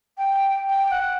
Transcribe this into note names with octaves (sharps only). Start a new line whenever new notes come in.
G5
G5
F#5